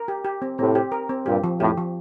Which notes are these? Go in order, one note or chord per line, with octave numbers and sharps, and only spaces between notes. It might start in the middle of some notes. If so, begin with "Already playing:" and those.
Already playing: A#4
G4
G4
C4
A2 C3 C4
G4
A#4
C4
G2 A#2 G4
F3
F2 A2 G4
F3